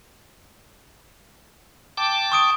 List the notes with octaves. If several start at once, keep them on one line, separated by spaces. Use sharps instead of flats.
G5 A5 D6
C#6 D#6 D7